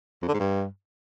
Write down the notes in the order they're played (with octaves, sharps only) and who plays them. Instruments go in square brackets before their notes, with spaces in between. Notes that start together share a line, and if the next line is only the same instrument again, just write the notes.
[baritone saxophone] F2
D3
G#2
G2